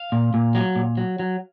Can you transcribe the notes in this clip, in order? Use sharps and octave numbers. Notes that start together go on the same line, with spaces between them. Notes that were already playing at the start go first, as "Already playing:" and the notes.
Already playing: F5
A#2
A#2
F#3
A#2
F#3
F#3